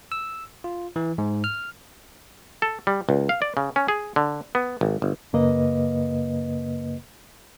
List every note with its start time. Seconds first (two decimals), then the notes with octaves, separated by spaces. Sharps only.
0.12 E6
0.64 F4
0.96 E3
1.18 G#2
1.44 F6
2.62 A4
2.87 G3
3.09 C#2
3.29 F5
3.42 D5
3.57 C#3
3.76 C#4
3.88 G#4
4.16 D3
4.55 B3
4.81 G#1
5.02 G1
5.33 F#2 C#3 A#3 B4 D#5